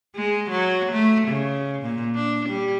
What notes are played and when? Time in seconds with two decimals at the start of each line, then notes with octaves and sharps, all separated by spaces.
0.16 G#3
0.50 F#3
0.93 A3
1.28 C#3
1.82 A#2
2.15 D4
2.49 G3